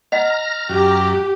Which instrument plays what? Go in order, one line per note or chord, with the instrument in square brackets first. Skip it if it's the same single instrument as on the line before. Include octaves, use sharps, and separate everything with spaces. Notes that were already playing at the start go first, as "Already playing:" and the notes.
[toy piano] D#5 F#5 [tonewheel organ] A#5 F6 A#6
[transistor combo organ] F#2 [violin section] G4